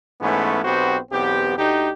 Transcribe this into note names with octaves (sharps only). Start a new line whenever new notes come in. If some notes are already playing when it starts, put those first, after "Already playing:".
G#2 E3 A3 B3 C#4
B1 B3 C4 F#4 G4 C5
B1 E2 B3 C4 G4
D2 D#4 G4